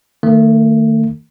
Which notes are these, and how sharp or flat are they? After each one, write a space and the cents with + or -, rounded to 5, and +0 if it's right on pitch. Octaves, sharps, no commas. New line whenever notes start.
D#3 +0 A3 +35